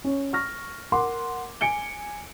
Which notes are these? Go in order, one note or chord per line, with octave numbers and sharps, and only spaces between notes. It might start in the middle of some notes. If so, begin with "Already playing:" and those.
C#4
C#6 F6 A#6
A#4 F#5 C6 D6
G#5 C#7 D7 G7